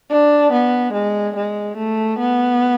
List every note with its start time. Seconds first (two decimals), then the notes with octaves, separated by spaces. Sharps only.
0.11 D4
0.53 B3
0.93 G#3
1.36 G#3
1.77 A3
2.19 B3